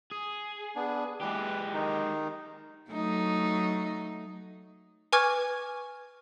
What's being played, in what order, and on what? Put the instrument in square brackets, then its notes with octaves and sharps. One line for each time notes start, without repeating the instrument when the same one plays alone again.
[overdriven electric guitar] G#4
[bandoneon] B3 D4
[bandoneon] E3 B4 [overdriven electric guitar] G#3 G4
[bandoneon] D#3 D#4
[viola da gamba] F#3 A3 D#4
[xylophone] B4 G#5 C#6 D6 F6 G#6